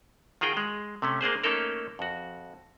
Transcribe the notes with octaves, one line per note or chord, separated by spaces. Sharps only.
D#3 F4 F#4 G#4 G5
G#3
C3 A3 C#4
A#3 D4 G#4 C5
A3 A#3 C#4 D#4 A4 A#4
F2 F#4